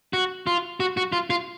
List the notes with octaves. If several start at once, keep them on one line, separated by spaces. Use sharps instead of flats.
F#4
F4
F#4
F#4
F4
F4